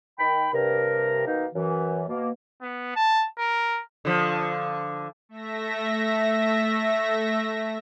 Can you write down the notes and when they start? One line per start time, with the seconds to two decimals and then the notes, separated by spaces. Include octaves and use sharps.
0.19 D#3 G5 B5
0.52 G2 C3 A#4
1.26 B2 D#3 A#3 D#4
1.55 F#2 E3
2.09 B2 A#3
2.62 B3
2.96 A5
3.38 A#4
4.05 D3 F3
5.29 A3 E5 A#6